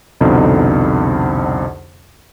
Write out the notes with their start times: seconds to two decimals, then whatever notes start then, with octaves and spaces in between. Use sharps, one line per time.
0.21 C2 F2 B2 D3 D#4